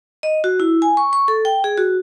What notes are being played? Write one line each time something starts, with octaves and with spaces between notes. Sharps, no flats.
D#5
F#4
E4
G#5
C#6
C#6
A4
G5
G#4
F#4